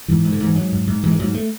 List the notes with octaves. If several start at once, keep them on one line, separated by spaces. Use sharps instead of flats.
G#2 E3
G#2
D3
G#2 E3
G#2 F#3
G#2
G#2
G#2 E3
G#3
G#2 F#3
A3